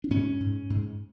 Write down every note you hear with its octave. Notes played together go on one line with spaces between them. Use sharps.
D4
G#2 C#4
G#2
G#2